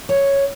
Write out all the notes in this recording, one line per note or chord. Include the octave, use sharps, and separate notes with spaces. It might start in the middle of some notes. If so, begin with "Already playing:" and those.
C#5